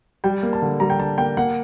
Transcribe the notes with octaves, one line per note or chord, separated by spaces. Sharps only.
G3 G5
A#3
A5
D3
G3 A#5
G5
D3 A5
A#3 G5
A#3 F#5